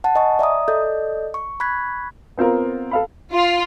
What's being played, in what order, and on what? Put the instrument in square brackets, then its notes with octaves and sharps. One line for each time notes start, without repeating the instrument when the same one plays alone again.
[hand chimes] F#5 A5
D#5 G#5 C#6
D5 E5 A#5 D#6
A4 D5 D#5 G6
C#6
B5 C#6 F#6 G#6 B6
[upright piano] B3 C4 F4 A#4
A4 F5 B5
[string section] F4